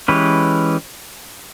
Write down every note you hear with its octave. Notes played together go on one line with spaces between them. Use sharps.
E3 G#3 C#4 G4 B4